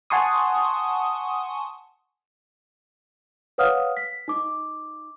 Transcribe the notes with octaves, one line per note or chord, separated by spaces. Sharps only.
F#5 G#5 A5 C6 C#6 D#6
B4 C#5 F5 F#5 D#6 F6
B6
D#4 D6